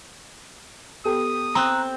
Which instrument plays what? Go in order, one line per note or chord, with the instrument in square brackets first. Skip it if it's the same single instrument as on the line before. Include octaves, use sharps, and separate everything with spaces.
[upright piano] B3 G4 A4 [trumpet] D#6
[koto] C4 [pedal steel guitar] A#5 F#6